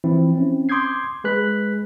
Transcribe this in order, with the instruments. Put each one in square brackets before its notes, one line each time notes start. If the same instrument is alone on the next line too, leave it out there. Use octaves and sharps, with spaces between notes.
[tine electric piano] E3 F3 C4 E4
C4 C#4
C6 D6 D#6 G6 G#6 C7
G#3 G#4 B4 F#6 B6